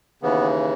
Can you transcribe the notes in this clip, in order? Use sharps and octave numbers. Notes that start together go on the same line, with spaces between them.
D#2 C#3 E3 B3